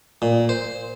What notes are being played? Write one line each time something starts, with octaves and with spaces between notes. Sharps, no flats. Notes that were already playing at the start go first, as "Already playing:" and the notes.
A#2
C5